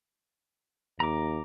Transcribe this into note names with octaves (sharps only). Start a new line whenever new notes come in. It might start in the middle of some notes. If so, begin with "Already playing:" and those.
D#2 A#5 D6